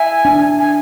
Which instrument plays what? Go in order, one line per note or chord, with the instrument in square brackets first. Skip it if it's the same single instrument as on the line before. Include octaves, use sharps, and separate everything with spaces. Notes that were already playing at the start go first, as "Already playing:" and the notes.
Already playing: [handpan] E5 [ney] G#5
[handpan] D4
[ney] G#5